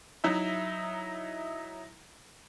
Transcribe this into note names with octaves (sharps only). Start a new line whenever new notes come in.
F#3 D#4 E4 E5